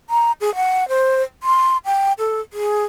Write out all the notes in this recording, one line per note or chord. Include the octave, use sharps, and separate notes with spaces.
A#5
G#4
F#5
C5
C6
G5
A4
G#4